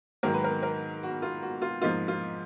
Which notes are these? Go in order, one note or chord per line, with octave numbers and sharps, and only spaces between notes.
G#2 D#3 F#3 A#3 A#4
B4
A#4
A#4
F#4
F4
F#4
F4
G#2 F3 A#3 D#4 F4
F4